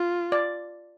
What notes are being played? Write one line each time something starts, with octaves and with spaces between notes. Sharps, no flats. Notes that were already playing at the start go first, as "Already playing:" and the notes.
Already playing: F4
D5